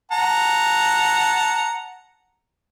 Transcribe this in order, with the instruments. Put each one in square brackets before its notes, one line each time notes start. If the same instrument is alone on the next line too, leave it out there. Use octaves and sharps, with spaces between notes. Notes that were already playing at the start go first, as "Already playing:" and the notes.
[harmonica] F#5 A5 A#5